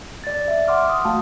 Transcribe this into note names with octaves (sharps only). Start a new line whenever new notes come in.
D5 A6
E5
F#5 C6 D6 F6
D#6
A3 F#4 F5 G5 A5